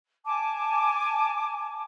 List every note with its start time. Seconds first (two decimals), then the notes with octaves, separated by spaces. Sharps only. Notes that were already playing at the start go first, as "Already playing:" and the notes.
0.24 G#5 A5 D6